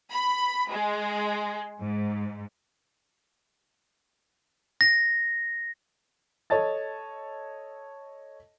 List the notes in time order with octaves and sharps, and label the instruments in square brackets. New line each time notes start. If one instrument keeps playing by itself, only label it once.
[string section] B5
G#3
G#2
[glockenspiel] A#6
[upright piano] A4 C#5 D#5 A5 A6